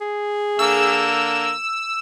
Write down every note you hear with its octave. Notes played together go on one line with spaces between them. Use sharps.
G#4
D3 A#3 E6